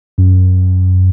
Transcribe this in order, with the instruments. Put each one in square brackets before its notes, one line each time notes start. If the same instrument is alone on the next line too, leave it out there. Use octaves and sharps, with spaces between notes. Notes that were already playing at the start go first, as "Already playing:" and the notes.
[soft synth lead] F#2